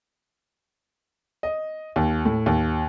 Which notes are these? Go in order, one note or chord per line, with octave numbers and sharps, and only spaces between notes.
D#5
D#2
A2
D#2